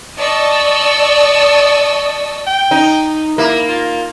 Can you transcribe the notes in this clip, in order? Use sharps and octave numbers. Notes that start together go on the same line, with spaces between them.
D5 D#5 A5 C#6 D#6 E6
G5
D#4
A#3 E4
F4